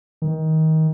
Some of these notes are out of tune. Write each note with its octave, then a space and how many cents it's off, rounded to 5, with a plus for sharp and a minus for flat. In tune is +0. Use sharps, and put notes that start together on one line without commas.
D#3 +25